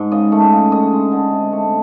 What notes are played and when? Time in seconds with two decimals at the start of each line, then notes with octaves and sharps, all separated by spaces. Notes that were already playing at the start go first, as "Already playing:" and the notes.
Already playing: G#2
0.12 C#3 D#5
0.32 A3
0.42 D#5
0.52 C#3
0.72 D3 D#5
0.93 G#3
1.12 D3
1.31 C3
1.52 A3